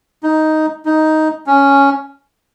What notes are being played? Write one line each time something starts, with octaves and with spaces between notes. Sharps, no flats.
D#4
D#4
C#4